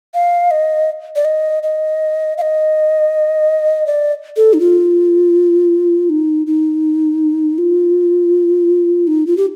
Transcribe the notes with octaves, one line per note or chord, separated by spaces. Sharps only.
F5
D#5
D5
D#5
D#5
F5
D#5
D5
A4
D#4
F4
D#4
D#4
F4
D#4
F4
G4